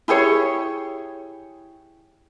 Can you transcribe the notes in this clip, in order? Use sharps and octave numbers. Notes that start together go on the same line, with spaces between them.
E4 G4 G#4 C#5